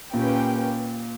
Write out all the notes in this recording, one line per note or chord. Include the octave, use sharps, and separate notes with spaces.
A#2 A#3 C#4 G4 B4 G5